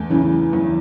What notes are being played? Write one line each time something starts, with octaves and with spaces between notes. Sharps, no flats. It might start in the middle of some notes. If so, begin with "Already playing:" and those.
Already playing: E2 A3
C#3 E3
E2